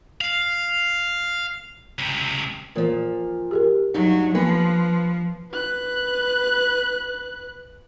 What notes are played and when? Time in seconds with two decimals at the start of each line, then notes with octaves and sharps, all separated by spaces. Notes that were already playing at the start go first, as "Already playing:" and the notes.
0.21 F5
1.99 C#2 C3
2.75 A#2 E3 F3 A#3 A#4
3.51 G4 G#4 A#4
3.94 G2 F#3 D#4
4.35 F3 A#3 B3 B4
5.52 B4 F#6